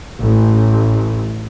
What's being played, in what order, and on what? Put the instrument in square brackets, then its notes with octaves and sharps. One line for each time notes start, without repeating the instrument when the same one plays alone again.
[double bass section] A1